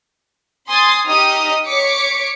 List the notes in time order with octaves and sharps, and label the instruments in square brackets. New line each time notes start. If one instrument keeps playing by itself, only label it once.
[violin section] G#5 C6 D#6 A6
D#4 G4 D#5 D#6 F6
C#5 C#6 D6 B6 C#7